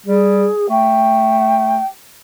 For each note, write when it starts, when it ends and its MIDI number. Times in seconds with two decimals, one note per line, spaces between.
0.06 0.48 55
0.06 0.67 68
0.70 1.79 57
0.70 1.86 79